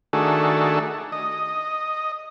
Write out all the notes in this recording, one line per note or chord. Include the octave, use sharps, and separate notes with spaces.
D#3 A3 D4 F#4 G#4 A4
D#5